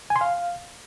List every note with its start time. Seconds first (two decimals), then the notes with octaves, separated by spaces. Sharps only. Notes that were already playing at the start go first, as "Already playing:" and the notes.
0.10 G#5
0.16 C6
0.21 F5